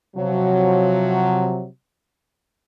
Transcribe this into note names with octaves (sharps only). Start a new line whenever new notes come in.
C3 F3 F#3